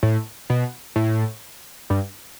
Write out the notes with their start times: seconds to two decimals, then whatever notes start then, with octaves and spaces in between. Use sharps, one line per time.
0.03 A2
0.50 B2
0.96 A2
1.90 G2